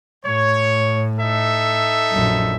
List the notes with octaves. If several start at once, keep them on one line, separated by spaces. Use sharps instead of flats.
A2 C#5
D#4 A4 E5
A#1 F#2